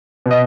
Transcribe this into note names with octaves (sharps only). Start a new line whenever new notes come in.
B2
D#5